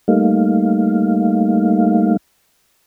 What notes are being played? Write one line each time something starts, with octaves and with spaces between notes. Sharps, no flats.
G3 A3 A#3 D#4 F5